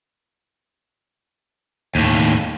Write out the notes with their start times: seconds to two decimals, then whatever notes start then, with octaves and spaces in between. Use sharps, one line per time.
1.95 D#2 A2